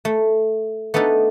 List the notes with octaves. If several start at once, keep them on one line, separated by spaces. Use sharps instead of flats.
A3
A3 B3 D4 D#4 A4